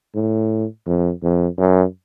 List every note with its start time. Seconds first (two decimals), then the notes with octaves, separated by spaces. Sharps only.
0.15 A2
0.87 F2
1.23 F2
1.58 F#2